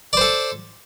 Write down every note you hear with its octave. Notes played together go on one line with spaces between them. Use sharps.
A4 C5 D5